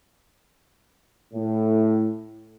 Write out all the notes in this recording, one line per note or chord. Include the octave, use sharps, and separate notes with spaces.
A2